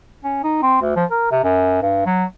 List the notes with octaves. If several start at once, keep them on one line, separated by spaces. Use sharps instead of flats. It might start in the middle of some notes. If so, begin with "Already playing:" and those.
C#4
D#4
C4
D2
F3
A#4
C3
F#2
G2
F#3